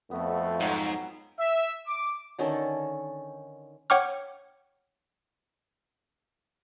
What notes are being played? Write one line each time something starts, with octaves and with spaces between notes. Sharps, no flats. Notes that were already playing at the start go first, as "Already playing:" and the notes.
F2 A3 B3 F#4
G#2 F#3
E5
D6
D3 D#3 C#4 A4
C#5 F#5 G5 C#6 D6 F6